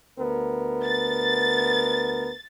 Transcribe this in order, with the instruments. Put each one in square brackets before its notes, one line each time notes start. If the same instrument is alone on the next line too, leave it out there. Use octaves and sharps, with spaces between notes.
[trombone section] D2 B3 A#4
[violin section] A6